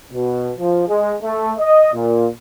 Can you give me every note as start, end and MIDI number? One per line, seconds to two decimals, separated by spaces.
0.13 0.52 47
0.59 0.84 53
0.88 1.15 56
1.22 1.53 57
1.59 1.91 75
1.94 2.28 46